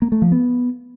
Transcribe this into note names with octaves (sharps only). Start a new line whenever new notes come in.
A#3
A3
F3
B3